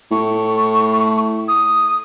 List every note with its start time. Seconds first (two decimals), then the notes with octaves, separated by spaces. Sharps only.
0.11 A2 C#6
1.48 D#6